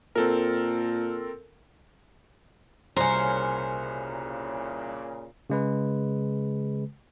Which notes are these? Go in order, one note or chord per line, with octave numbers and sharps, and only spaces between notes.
A#2 C4 A4 A#4
C2 A#2 C#3 C#4 A#4 C5
C#3 G#3 B4